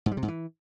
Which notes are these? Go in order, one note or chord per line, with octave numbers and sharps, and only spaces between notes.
G#2
G3
C3
G#2
E3